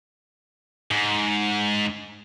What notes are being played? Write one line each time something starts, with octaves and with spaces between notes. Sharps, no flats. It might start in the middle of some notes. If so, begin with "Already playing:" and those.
G#2